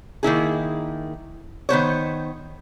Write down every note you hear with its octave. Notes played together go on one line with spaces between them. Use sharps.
D#3 A#3 E4 G#4
D#3 B3 C5 C#5